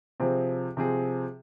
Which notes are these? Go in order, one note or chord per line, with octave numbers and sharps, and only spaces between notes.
C3 F3 C4 G#4
C3 F3 C4 G#4